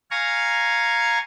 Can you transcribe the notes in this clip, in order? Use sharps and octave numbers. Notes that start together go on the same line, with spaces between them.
F5 G#5 A#5 C#6